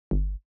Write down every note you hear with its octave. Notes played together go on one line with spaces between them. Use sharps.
G1